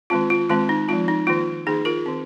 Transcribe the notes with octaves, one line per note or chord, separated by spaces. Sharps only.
D#3 G#3 C4 F4
F4
D#3 G#3 C4 F4
D#4
F3 G#3 C4 F4
D#4
D#3 A#3 F4
D#3 A#3 D#4 G#4
F4 A#4
D#3 C4